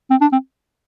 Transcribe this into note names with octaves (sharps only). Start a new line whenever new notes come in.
C4
D4
C4